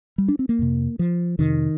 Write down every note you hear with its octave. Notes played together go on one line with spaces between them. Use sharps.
G3
D4
C4
A#3
F2 C3
F3
F2 C3 D#3